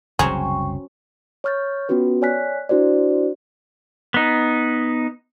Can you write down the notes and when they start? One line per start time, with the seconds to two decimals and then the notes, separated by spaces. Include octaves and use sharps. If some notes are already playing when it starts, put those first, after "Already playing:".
0.19 F#1 C2 F#3 C#4 G#4 C5 G5 C#6
1.44 C#5 C#6 F6 G6 A6
1.89 B3 C#4 F4 F#4 B4
2.22 C#5 D5 G#5 F6 F#6 B6
2.69 D4 E4 F#4 C5 D5
4.14 B3 D#4